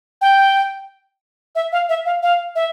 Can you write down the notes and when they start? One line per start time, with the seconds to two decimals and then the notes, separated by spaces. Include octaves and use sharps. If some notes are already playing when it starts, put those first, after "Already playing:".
0.21 G5
1.55 E5
1.72 F5
1.89 E5
2.06 F5
2.23 F5
2.55 E5